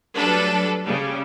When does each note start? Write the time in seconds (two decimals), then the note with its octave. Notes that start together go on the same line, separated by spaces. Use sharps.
0.16 F#3 G3 A3 D4 A4 B4
0.86 C#3 G3